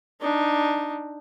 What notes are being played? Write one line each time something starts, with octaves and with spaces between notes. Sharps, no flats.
D4 D#4